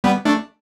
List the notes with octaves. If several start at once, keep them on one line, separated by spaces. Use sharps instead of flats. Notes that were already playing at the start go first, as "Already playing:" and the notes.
G3 B3
A3 D4